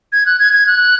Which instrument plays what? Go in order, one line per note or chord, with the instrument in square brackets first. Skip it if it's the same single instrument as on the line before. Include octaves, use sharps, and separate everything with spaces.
[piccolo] G#6
F#6
G#6
G#6
F#6